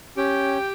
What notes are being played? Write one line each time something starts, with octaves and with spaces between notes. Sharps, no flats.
C#4 G4 G5